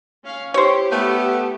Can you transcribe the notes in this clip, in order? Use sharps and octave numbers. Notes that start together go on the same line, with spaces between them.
C#4 F5
E4 G4 C5 C#5
A3 B3